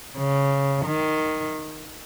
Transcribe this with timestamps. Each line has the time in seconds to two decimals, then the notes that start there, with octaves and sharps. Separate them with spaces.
0.18 C#3
0.85 D#3